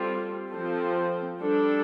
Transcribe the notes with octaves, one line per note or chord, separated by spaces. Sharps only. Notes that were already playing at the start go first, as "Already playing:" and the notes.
Already playing: G3 C4 F4 A4
F3 C4 A4 C5
G3 D4 A4